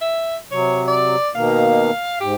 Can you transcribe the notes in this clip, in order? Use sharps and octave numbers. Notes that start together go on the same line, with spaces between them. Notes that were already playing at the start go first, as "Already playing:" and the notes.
E5
C3 F#3 C#5
D5
B2 D#3 A#3 F5
G#2 G4